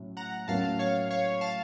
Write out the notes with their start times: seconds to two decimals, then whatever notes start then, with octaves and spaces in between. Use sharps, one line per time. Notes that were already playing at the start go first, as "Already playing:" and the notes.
Already playing: A2 F#3 C#4
0.17 F#5 A#5
0.48 A2 F#3 A#3 C#4 F5 A5
0.79 C#5 F5
1.11 C#5 F5
1.41 F5 A5